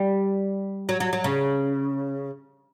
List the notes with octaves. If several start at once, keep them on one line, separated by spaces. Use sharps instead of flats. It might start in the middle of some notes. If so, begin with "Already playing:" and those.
Already playing: G3
F#3
F#3
F#3
C#3